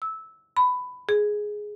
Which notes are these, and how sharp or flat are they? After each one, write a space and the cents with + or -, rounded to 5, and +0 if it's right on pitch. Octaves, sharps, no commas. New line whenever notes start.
E6 -15
B5 +15
G#4 +5